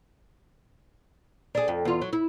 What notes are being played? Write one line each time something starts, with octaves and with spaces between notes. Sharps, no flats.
D4 G#4
F2
E2 F4
F#3
E4